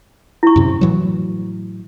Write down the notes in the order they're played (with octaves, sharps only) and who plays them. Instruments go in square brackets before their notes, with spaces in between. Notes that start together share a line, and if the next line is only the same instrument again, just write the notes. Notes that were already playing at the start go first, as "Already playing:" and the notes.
[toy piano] E4 C#6
[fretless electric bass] F#2 C3
A2 E3 F#3